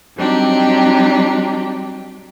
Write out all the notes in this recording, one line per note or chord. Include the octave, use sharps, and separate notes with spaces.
F#3 G3 C4 D4 D#4 G4